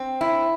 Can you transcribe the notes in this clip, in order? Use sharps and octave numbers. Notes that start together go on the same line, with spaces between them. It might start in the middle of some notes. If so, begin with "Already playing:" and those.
Already playing: C4
E4